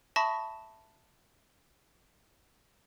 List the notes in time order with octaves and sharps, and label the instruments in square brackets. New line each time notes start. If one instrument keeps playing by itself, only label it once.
[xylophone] E5 A5 B5 C#6 D#6 A#6